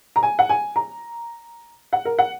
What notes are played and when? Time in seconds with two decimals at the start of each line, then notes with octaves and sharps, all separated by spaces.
0.16 A#5
0.23 G#5
0.39 F#5
0.49 G#5
0.76 A#5
1.93 F#5
2.05 A#4
2.19 F#5